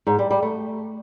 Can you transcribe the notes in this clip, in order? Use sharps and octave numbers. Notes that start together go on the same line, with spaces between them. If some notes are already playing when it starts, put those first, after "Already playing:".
G#2
G3
G3
A3